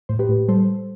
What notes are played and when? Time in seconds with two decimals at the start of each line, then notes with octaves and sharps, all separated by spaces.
0.09 A2 C5
0.19 G4 B4
0.29 A2
0.48 G3 A4 C5